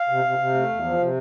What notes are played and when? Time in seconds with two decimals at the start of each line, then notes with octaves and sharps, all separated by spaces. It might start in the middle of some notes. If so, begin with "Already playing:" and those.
Already playing: F5
0.09 C3
0.24 C3
0.38 C3
0.54 A3
0.69 E2
0.84 F3
0.98 C3